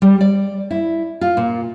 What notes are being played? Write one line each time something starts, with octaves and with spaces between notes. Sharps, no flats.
G3
D5
E4
F4
A#2